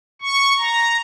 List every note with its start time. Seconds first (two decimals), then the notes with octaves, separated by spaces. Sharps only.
0.22 C#6
0.59 A#5